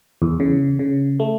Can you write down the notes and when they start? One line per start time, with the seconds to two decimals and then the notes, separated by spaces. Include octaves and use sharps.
0.22 E2
0.40 C#3
0.79 C#3
1.20 A3